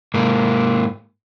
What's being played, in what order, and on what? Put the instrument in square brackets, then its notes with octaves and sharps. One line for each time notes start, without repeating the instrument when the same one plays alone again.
[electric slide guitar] G#2 A#3